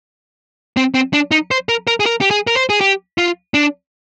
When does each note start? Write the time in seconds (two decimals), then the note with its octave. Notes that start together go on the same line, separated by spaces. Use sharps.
0.77 C4
0.94 C4
1.14 D4
1.31 D#4
1.51 C5
1.69 A#4
1.87 A#4
2.00 G#4
2.06 A#4
2.21 G4
2.31 G#4
2.47 A#4
2.55 C5
2.70 G#4
2.81 G4
3.18 F4
3.54 D4